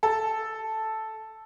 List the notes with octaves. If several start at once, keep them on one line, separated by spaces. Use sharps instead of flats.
A4